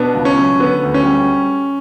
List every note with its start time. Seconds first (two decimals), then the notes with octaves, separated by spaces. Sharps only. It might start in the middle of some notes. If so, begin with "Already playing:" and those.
Already playing: B2 B3 D4
0.15 C#2
0.25 C#4
0.38 F#3
0.59 D3 B3
0.83 D2
0.94 C#4
1.05 G3